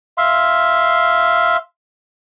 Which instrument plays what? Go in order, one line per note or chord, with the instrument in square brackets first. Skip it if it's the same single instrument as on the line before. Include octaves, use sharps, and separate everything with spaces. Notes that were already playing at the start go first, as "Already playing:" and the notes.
[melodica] E5 F5 C6